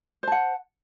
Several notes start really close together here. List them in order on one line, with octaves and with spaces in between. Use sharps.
C5 A5 F#5